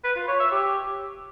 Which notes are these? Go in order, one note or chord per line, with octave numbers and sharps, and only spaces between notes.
B4
F4
C#5
E5
G4